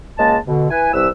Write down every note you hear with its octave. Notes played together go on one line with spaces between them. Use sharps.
C#2 G#3 A#3 A5
B2 D3
E4 B4 G#5
C2 B4 E6